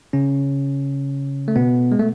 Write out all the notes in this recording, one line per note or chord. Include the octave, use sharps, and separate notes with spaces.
C#3 C#4
A3
B2 B3
G#3
A3